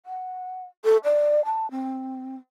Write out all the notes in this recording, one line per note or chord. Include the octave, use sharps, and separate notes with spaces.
F#5
A4
D5
A5
C4